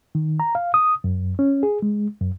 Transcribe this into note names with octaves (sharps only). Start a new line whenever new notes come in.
D#3
A#5
F5
D#6
F#2
C#4
G#4
G#3
F#2